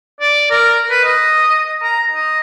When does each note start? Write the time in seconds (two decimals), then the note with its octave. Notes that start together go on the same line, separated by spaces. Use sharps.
0.21 D5
0.51 A#4
0.91 B4
1.04 D#5
1.83 A#5
2.12 D#5